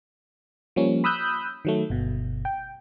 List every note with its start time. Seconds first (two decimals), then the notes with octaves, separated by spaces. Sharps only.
0.76 F3 G3 A#3 C#4
1.04 B5 D#6 E6 F#6 G6
1.65 D#3 F#3 A3
1.90 G1 B2
2.45 G5